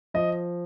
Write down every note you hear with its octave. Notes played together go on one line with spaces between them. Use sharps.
F3 D#5